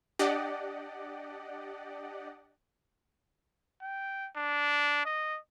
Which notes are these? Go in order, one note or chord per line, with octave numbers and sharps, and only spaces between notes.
D4 G4 D5 D#5 F#5
G5
D4
D#5